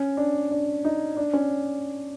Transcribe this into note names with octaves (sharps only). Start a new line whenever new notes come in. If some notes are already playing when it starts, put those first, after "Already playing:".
Already playing: C#4
D4
D4
D#4
D4
C#4